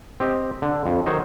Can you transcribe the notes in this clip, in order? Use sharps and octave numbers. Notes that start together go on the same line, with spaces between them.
C4 G4 D#5
D3
F2
D#3 F#3 C5 C#5 D#5